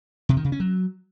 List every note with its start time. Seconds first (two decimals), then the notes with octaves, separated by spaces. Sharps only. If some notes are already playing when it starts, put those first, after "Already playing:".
0.29 C3
0.37 D#3
0.44 C#3
0.52 C#4
0.60 F#3